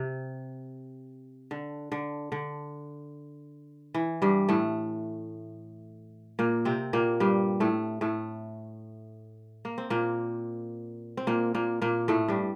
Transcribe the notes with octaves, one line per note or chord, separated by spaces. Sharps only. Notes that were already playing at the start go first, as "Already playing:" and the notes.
Already playing: C3
D3
D3
D3
E3
G2 G3
A2 A3
A#2 A#3
C3 C4
A#2 A#3
G2 G3
A2 A3
A2 A3
A#3
C4
A#2 A#3
C4
A#2 A#3
A#2 A#3
A#2 A#3
A2 A3
G2 G3